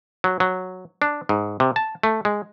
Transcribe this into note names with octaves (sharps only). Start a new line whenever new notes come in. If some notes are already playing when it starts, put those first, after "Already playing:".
F#3
F#3
D4
G#2
C3
A5
A3
G#3